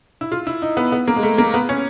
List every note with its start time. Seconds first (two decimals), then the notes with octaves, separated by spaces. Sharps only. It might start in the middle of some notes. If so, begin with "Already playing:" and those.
0.21 E4
0.32 F4
0.47 E4
0.62 D#4
0.77 B3
0.92 B3
1.08 A#3
1.16 G#3
1.23 A3
1.38 A#3
1.54 B3
1.69 C#4